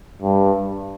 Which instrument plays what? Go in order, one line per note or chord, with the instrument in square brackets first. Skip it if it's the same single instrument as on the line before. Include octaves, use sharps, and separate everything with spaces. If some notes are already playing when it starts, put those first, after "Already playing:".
[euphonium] G2